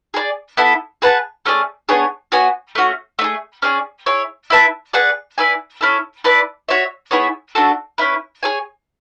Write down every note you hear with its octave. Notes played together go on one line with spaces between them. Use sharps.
G#4 B4 D5
B3 E4 A4
G#4 B4 F#5 A5
A3 C#4 G#4 D5
B3 D4 G#4 C#5
B3 F#4 C#5 G#5
A3 C#4 F#4
A3 D4
G#4
C#4 G#4 D5
E4 G#4 C#5
E4 B4 E5 A5
G#4 B4 D5 F#5
E4 B4 D5 G#5
C#4 E4 A4
E4 B4 D5 A5
F#4 C#5 E5
B3 E4 G#4 C#5
A3 D4 F#4 A4
C#4 E4 B4
G#4 C#5 G#5